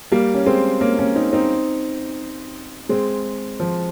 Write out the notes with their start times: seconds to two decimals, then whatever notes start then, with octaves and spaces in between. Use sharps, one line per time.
0.12 G3 A#3
0.34 C#4
0.46 G#3 C4
0.81 A#3 C#4
0.99 A#3 C#4
1.15 C4 D#4
1.33 C4 D#4
2.89 G#3 C4
3.60 F3